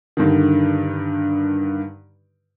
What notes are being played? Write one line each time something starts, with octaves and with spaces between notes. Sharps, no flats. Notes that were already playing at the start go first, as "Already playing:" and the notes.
G2 D3 D#3